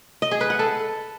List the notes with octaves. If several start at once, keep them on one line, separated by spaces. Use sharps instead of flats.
D#5
G#4
B4
F#5
A4